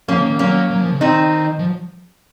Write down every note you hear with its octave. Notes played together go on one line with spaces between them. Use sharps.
F3 A#3 C#4
D#3
D#3
F#3 A#3 C#4
F#3
F3
C#3
D#3 C4 D#4
F3